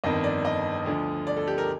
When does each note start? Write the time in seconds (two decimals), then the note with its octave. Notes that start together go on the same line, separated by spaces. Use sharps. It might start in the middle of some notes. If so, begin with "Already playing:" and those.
0.04 G1 F2 D#3 D#5
0.24 D5
0.45 D#5
0.86 D2 D3 F3
1.27 D5
1.37 A4
1.47 G4
1.58 A#4